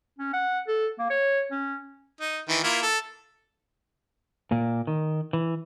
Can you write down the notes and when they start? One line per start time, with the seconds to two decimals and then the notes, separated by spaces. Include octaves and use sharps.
0.19 C#4
0.34 F#5
0.68 A4
0.99 A#3
1.10 C#5
1.51 C#4
2.21 D#4
2.49 D#3 E3
2.64 A#3 E4 F4
2.82 A4
4.52 A#2 A#3
4.87 D#3
5.33 E3